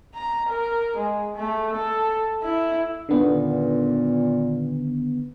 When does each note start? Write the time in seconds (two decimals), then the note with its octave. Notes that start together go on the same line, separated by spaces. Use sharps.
0.14 A#5
0.49 A#4
0.96 G#3
1.36 A3
1.75 A4
2.43 E4
3.09 A#2 D3 D#3 B3